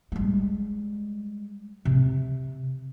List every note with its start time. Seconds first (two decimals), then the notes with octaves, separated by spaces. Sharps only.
0.12 G3 G#3
1.85 C3